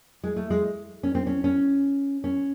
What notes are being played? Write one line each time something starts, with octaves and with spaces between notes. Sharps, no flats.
G#3
A3
G#3
C#4
C4
C#4
C#4
C#4